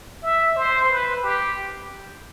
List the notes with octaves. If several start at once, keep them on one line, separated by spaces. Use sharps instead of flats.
E5
C5
B4
G4